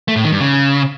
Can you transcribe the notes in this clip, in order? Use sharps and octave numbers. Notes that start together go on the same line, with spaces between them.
A3
A2
D#3
G2
C#3